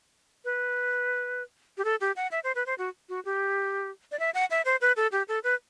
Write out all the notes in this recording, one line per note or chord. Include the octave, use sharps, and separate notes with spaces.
B4
G4
A4
G4
F#5
E5
C5
B4
C5
F#4
F#4
G4
D5
E5
F#5
E5
C5
B4
A4
G4
A4
B4